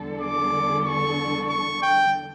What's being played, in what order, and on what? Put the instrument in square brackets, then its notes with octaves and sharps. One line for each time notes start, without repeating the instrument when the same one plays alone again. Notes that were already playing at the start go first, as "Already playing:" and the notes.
Already playing: [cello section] E2 D3 G3 D4 A4
[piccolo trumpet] D6
C#6
C#6
G5